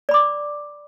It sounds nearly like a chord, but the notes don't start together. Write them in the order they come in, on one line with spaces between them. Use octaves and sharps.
D5 B5 D6